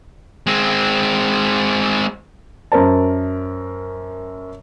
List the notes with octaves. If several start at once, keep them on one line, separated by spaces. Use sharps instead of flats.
G#3 C4
F#2 A#4 C5 A5